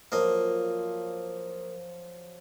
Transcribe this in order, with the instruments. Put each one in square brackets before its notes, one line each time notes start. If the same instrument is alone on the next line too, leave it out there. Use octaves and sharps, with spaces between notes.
[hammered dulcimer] F3 F#3 [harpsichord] A#3 D#5